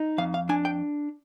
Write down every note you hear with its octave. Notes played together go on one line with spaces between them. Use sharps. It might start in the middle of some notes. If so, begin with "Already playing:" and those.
Already playing: D#4
F2 F5
F5
D4 G#5
G5